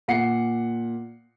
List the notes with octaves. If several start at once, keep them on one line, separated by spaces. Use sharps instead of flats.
A#2 F#5 C7 C#7